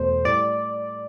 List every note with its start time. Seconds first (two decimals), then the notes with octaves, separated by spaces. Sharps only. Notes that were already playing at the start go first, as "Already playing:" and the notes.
Already playing: E2 B2 A3 C5
0.25 A2 G3 D5